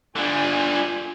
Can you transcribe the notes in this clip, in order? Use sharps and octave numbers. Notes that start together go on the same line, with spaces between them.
D3 G3 F4 G#5